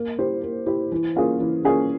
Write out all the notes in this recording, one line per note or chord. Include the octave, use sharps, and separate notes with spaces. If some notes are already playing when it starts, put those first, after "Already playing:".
Already playing: A#3
E4 G4 C5
A#3
E4 G4 C5
E3
A#3 C#4 F4 G#4
E3
A#3 C#4 F4 G#4